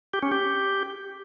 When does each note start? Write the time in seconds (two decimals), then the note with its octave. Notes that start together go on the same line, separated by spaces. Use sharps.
0.13 G4
0.23 C#4
0.32 G4